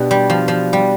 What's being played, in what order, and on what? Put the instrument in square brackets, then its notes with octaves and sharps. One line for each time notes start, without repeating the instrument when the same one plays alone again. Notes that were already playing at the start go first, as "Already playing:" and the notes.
Already playing: [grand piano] B2 B3 D4 G4
[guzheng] G3
F3
F3
G3